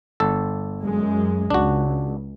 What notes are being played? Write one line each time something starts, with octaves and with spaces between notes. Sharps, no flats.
G1 A4
F#2 G#3
C#2 D4 F#4